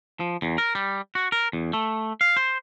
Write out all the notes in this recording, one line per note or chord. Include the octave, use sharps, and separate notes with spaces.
F3
E2
A#4
G3
F#4
A#4
E2
A3
F5
C5